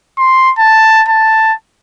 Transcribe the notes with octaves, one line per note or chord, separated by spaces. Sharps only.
C6
A5
A5